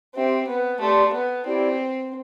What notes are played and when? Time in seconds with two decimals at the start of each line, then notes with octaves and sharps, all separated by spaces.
0.15 C4 G4 C5 E5 G5
0.47 B3
0.80 A3 G4 D5 A5 C6
1.13 B3
1.45 C4 E4 G4 D5 G5